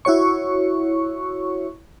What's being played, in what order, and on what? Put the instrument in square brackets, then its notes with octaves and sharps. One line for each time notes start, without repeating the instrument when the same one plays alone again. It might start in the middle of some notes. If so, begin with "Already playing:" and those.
[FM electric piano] E4 F#4 C#5 C#6